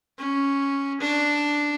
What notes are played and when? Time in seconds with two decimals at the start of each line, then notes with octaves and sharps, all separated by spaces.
0.18 C#4
1.00 D4